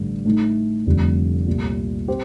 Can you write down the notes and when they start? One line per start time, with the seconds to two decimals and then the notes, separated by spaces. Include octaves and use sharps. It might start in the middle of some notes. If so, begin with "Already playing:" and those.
Already playing: A1 G2 D3
0.25 A2 A3 D#4
0.86 F1 F2 D3 G3
1.46 C2 A#2 G3
2.08 C4 G4 C5